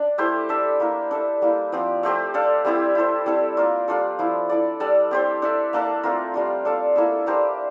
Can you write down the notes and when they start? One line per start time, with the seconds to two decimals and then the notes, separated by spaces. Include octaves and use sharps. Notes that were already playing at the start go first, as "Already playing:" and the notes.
Already playing: D4
0.18 A3 E4 G4 C5
0.49 D4 A4 E5
0.80 A#3 E4 A#4
1.11 D4 A4 E5
1.42 G3 A#3 E4
1.72 F3 C4 G4
2.03 A3 C4 G4 C5
2.34 D4 A4 D5 F5
2.65 G3 C4 E4 G4
2.95 E4 A4 C5
3.26 G3 C4 E4 A4
3.57 A#3 F4 A#4 D5
3.88 G3 D4 F4 A4
4.19 F3 C4 E4
4.49 E4 A4 D5
4.80 G3 D4 A4 D5
5.11 C4 G4 C5
5.42 D4 A4 E5
5.73 A#3 D4 A4
6.03 A3 C4 F4 A#4
6.34 G3 D4 F4
6.65 D4 A4 D5 F5
6.96 A#3 E4 A4 E5
7.26 A#3 D4 G4 C5